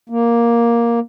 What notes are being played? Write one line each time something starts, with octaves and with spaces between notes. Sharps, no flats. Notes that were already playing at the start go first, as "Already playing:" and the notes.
A#3